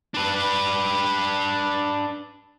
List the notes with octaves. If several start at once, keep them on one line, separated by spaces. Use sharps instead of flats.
D4 B4